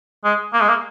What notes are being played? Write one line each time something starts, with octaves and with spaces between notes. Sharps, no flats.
G#3
A#3
G#3
A#3